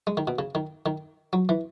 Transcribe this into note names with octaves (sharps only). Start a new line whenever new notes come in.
G#3
D#3
B2
C#3
D#3
D#3
F#3
E3